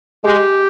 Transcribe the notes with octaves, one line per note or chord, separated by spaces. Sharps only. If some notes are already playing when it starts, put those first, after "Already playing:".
G#3 G4